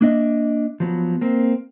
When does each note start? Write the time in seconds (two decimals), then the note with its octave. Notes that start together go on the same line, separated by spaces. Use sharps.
0.01 A#3 D4 D#5 E5
0.80 F3 F#3 B3
1.21 A#3 C4